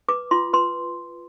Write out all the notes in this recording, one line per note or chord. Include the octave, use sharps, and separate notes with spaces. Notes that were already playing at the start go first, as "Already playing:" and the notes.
B4 D6
F4 C6
B4 C6